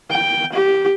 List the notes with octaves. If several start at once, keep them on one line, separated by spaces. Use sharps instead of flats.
G5
G4